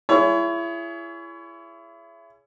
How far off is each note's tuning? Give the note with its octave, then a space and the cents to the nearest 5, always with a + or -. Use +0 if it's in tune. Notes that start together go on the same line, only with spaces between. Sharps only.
E4 +30 G#4 +10 C#5 +30